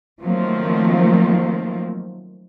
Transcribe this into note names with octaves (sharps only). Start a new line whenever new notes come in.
D#3 F3 F#3 A3 A#3 C4